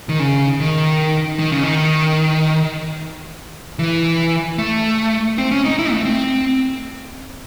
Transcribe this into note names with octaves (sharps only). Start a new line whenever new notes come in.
D#3
C#3
D#3
D#3
C#3
D#3
E3
A3
C4
C#4
D#4
E4
A3
C4